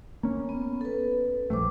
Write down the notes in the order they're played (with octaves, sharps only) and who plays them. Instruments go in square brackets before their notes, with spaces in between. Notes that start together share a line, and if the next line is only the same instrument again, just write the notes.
[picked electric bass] A#3 C#4
[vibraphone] B3
A4 B4
[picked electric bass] A#1 A3 [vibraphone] G3 C5 D6